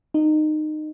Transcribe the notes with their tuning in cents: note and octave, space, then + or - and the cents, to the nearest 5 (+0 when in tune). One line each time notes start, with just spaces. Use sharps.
D#4 -20